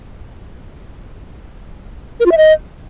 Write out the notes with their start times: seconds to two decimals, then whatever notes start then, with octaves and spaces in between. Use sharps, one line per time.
2.20 A#4
2.26 F4
2.32 E5
2.37 D#5